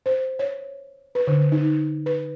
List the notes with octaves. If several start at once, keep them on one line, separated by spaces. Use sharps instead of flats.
C5
C#5
B4
D3
D#4
B4